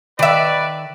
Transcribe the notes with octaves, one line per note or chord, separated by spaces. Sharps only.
D#3 B4 D5 E5